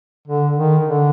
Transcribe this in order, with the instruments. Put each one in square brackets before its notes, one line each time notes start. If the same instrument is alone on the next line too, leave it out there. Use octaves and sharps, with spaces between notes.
[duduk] D3
D#3
D3